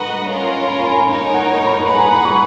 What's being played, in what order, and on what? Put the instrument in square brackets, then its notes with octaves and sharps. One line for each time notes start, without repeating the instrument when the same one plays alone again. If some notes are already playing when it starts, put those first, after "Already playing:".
Already playing: [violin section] F#4 B4 D#5 F#5 [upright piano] A#5 B5
[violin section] C#4 F4 A#4 C#5
[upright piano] B5
B5
G#5
A#5
[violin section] D#4 A#4 C#5 [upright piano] A#5
[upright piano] G#5
F#5
A#5
B5
[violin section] G#4 B4 F#5 [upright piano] A#5
[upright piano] G#5
A#5
B5
C#6